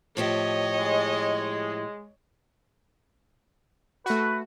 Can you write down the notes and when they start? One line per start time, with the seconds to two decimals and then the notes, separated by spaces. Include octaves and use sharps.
0.17 A2 F3 G4 C#5 D#5
0.79 G#3
4.06 A3 F#4 B4